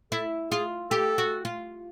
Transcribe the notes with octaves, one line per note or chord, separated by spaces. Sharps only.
E4 A4
F4 G#4
G4 A4
F#4
F4